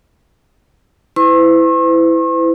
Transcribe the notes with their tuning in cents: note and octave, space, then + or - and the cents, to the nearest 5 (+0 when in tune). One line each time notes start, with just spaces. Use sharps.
E4 +0 B4 +45 C#6 -45